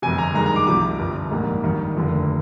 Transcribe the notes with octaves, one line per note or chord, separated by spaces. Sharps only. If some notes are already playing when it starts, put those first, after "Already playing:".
G1 F2 C3 G#5
A#5
G2 D#3 G#3 D#4 A#5
A#5
D6
C2 C3 F3 D6
G1 G2 F3
A#1 G#2 G3 A#3 D#4
G#1 G2 D#3
F1 D#2 D3 F3